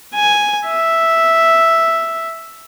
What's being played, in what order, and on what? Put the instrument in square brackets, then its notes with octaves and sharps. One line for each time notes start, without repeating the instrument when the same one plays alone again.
[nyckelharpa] G#5
E5